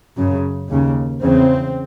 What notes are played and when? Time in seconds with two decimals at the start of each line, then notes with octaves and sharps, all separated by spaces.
0.16 F#2 C#3
0.69 D#2 C#3
1.22 E2 C#3 C4